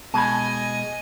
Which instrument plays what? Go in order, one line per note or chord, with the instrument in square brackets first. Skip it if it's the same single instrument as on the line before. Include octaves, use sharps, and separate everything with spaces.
[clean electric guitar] B2 G#3 [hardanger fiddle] D#5 G#5 [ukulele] A5 B5